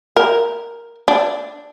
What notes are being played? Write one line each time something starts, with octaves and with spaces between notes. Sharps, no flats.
A#4
D4